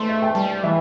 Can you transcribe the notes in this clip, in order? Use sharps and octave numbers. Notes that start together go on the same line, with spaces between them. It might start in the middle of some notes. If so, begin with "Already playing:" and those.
Already playing: A3 C6
E5
G5
G3 A5
E3 E5